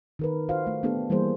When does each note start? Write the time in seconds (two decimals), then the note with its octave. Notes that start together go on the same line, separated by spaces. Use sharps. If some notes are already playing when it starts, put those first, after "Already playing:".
0.19 D#3 A#4 B4
0.49 F4 F#4 C5 F5
0.67 A3
0.83 A3 B3 D4 G4 A4
1.10 E3 G3 A#3 G#4 C5